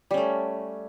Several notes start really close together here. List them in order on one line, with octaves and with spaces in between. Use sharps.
G3 C#4 A3